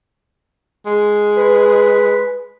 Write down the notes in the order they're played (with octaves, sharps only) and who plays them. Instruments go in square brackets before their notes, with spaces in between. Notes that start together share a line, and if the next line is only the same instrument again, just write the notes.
[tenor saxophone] G#3
[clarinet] B4